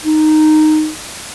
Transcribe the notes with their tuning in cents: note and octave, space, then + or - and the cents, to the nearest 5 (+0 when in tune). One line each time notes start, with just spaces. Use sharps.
D#4 -10